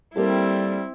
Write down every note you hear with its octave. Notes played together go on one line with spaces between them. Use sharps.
G3 A#3 C4 E4 G4 A4